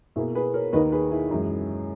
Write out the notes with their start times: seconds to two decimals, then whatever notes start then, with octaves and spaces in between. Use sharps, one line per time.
0.16 B2 A#3 E4 G#4
0.35 G#4 B4
0.54 A#4 C#5
0.73 D#2 D#3 A#3 B4 D#5
0.92 G#4 B4
1.11 E4 G#4
1.31 F#2 E3 G#3